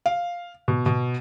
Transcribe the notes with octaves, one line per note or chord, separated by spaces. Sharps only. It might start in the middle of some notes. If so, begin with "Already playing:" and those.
F5
B2
B2